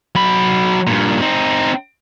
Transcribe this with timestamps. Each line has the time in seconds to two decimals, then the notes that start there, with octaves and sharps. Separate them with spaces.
0.15 F#3 B5
0.87 G2 A#2
1.21 C4 D#4